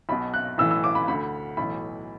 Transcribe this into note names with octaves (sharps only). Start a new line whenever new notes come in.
B1 B2 B5
F#6
B1 A2 E3 E6
E6
D6
B5
D2 D3 B5
B1 A2 E3 B5